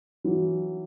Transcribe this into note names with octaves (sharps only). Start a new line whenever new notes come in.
E3 F#3